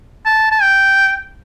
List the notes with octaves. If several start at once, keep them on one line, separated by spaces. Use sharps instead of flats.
A5
A5
G5